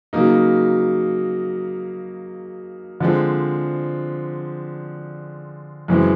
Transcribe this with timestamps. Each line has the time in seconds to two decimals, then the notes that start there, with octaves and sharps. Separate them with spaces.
0.13 C#3 F#3 A#3 D#4
3.00 D3 F3 G#3 C4
5.88 F#2 C#3 E3 G#3 C4